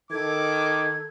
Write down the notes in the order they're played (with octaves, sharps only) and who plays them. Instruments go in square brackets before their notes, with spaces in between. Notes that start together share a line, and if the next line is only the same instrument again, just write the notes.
[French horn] D#3 [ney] A4 [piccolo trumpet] D6 [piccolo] G#6